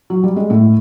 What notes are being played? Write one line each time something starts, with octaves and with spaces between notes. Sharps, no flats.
F#3
G3
G#3
A2 A3